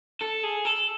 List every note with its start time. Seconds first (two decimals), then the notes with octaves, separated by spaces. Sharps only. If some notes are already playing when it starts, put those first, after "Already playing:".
0.21 A4
0.43 G#4
0.65 A4